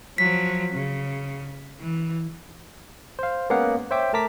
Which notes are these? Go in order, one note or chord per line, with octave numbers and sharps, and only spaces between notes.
F3 F#3 B6
C#3
E3
C5 F5
G#3 A#3 B3 C#4 F5 F#5
C5 C#5 E5 G5 D6
A3 A#4 A5 A#5 D6 B6